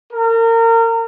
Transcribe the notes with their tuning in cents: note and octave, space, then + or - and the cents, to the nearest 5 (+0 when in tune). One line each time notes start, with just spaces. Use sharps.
A#4 -30